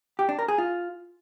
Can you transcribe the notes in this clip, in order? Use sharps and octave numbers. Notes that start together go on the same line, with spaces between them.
G4
D4
A#4
G#4
F4